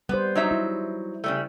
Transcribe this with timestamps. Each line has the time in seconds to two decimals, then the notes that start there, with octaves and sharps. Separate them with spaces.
0.09 G3 B3 C5
0.35 F#3 D#4 E5
0.51 E4
1.24 C#3 G3 A3